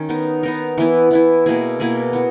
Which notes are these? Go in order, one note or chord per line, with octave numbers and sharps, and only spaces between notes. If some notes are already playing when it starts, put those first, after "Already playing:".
Already playing: D#3 C#4
B3 D#4 A#4
B3 D#4 A#4
E3 B3 E4
E3 B3 E4
B2 A#3 E4 G#4
B2 A#3 E4 G#4
B3 F#4